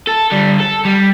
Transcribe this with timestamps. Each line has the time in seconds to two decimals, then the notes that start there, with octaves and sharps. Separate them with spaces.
0.07 A4
0.32 D3 G3
0.59 A4
0.85 G3